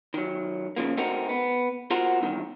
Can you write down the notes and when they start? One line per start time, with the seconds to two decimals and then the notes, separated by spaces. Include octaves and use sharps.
0.14 D#3 F#3
0.76 C#3 F3 A#3
0.97 A3 C4 D#4 F#4 A#4
1.29 B3
1.90 F4 F#4 A#4 C5 F#5
2.21 E2 G2 D#3